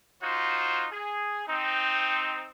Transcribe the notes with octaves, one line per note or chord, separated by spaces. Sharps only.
D#4 F4 F#4 C5
G#4
C4 D#4